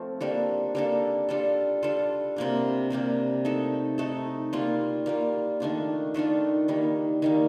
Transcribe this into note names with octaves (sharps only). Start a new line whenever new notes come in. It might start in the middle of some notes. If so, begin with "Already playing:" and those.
Already playing: F3 A3 C4 F4
G3 A#3 D4 A4
G3 A#3 D4 A4
G3 D4 F4 A4
G3 D4 F4 A4
C3 G3 A#3 D4
C3 G3 A#3 D4
A3 D#4 A4
A3 D#4 A4
G3 A#3 F4
G3 A#3 F4
D#3 A3 D4 F4
D#3 A3 D4 F4
D#3 G3 A#3
D#3 G3 A#3